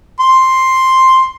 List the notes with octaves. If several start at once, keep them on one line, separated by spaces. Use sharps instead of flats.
C6